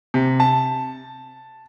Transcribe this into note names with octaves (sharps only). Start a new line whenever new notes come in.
C3
A5